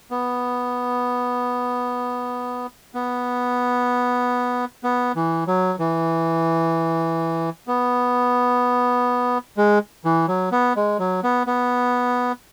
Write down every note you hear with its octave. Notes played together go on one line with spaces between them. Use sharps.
B3
B3
B3
E3
F#3
E3
B3
G#3
E3
F#3
B3
G#3
F#3
B3
B3